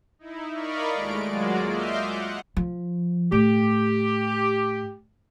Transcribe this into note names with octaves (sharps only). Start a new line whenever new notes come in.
D#4 E4
A#4 D5 D#5 F5 B5 C#6
D#2 G#3 A3 F4 D7
F#3 G#3 A#3 F4 F#4 D5
D#5 E5 C6 D6 F6 G6
F#5
F3
A2 G4